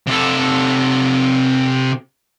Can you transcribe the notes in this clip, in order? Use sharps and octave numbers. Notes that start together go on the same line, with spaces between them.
C3 A4